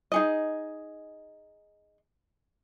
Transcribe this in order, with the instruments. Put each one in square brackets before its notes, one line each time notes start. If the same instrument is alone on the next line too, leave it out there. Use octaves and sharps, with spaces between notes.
[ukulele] D#4 G#4 D#5